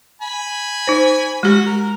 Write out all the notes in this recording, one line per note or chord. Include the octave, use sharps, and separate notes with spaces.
G#5 B5
D#4 C5
G#3 F#4 G4
A#4